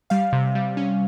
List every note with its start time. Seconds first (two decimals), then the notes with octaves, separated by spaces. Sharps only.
0.10 G3 F5
0.33 C3
0.55 G3
0.77 C#4